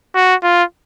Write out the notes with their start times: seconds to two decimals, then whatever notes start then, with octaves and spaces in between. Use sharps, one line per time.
0.15 F#4
0.43 F4